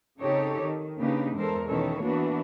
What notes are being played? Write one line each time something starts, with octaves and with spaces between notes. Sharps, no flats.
C#3 C4 D#4 G4 A4 C#5
D#3
C#3 A#3 D4 D#4 G4 B4
E2 G#3 A4 A#4 C5
B2 D#3 E3 C#4 A4 C#5
E3 A#3 B3 D4 F#4